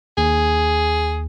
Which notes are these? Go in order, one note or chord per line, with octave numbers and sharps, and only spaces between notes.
D#2 G#4